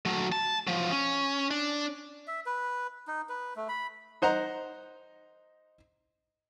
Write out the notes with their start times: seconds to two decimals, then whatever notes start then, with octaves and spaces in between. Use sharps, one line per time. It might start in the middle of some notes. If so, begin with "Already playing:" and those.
0.06 F#3 A3
0.32 A5
0.67 F3 F#3
0.91 C#4
1.51 D4
2.27 E5
2.46 B4
3.07 D#4
3.29 B4
3.56 A3
3.69 B5
4.22 D#4 C5 F#5 A#5